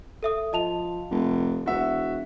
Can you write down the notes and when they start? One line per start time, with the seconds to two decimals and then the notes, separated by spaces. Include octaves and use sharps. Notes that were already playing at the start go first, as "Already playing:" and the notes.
0.23 A4 E5 D#6
0.53 F3 D#5 A5 F7
1.11 F1
1.66 E1 F#4 E5